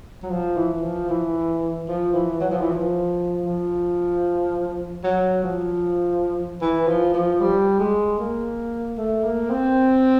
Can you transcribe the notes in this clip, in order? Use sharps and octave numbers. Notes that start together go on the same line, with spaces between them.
F#3
F3
E3
F3
E3
F3
E3
F#3
F3
E3
F3
F3
F#3
F3
E3
F3
F3
G3
G#3
A#3
A3
A#3
C4